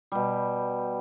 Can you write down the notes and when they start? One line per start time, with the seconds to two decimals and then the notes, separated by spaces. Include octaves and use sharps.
0.12 B2 G3